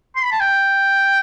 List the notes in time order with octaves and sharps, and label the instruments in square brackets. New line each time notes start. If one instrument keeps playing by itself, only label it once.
[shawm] C6
B5
A5
G5